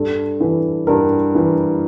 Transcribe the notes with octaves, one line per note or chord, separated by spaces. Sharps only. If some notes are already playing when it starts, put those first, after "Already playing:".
Already playing: G2 A4
E3
G2 A#4
E3